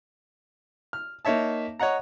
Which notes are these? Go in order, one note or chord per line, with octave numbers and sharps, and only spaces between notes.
F6
A#3 D#4 C#5 E5 A5
C#5 D#5 F#5 A#5